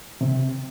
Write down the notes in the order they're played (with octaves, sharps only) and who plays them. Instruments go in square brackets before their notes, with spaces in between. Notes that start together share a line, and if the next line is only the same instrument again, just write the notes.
[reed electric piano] C3